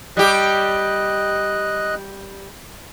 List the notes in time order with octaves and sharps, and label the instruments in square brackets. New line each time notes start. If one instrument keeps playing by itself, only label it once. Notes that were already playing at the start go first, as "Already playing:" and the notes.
[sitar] G3 G4 [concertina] D#5 F#6